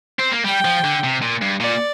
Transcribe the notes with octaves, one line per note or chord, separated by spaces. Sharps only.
C4
A#3
G3 G5
F3
D3
C3
A#2
G2
A#2 D5